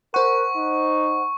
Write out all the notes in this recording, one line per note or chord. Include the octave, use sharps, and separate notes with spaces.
A#4 C5 F#5 C#6
D#4